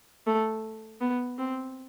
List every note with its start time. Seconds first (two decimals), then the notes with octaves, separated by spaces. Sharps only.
0.26 A3
1.01 B3
1.38 C4